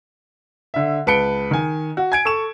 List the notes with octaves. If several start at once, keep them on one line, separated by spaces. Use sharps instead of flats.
D3 E5
C#2 B4 A5 C#7 D7 G7
D#3 G#5
F#4
G#5 G#6 D7
A4 C#6 E7